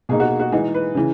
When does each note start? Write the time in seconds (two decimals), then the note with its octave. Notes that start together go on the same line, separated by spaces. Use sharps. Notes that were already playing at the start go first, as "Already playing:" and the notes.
0.09 B2 A#3 D#4 G#4
0.20 F#4
0.40 F#4
0.52 E3 G#3 D#4 G#4
0.75 B4
0.95 C#3 E3